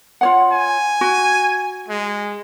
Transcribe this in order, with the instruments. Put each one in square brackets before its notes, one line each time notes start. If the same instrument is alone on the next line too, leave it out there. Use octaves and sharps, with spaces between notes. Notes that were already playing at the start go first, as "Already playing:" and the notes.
[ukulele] F4 C#5 F#5
[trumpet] G#5
[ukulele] F#4
[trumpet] G#3